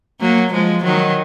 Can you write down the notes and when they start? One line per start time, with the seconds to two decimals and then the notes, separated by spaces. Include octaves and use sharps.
0.21 F#3 A#3
0.52 F3 G#3
0.84 D#3 F#3